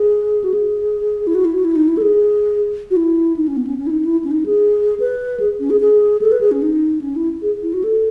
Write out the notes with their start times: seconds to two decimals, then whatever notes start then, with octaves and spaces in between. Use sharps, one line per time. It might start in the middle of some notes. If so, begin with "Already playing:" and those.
Already playing: G#4
0.44 F#4
0.54 G#4
1.27 E4
1.35 F#4
1.45 E4
1.55 F#4
1.65 E4
1.76 D#4
1.88 E4
1.97 A4
2.02 G#4
2.91 F#4
2.96 E4
3.37 D#4
3.48 C#4
3.57 B3
3.67 C#4
3.78 C#4
3.87 E4
3.91 D#4
4.05 E4
4.24 C#4
4.31 D#4
4.46 G#4
5.00 B4
5.40 G#4
5.60 C#4
5.70 G#4
5.80 G#4
6.22 A4
6.32 B4
6.41 G#4
6.51 C#4
6.62 D#4
7.01 C#4
7.16 E4
7.42 G#4
7.63 E4
7.74 F#4
7.84 A4